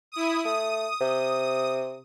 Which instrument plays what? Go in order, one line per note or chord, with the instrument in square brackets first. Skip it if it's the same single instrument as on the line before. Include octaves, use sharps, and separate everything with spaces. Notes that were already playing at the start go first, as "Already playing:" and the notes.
[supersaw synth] E4 D#6
[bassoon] A3 [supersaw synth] D#6
[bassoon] C3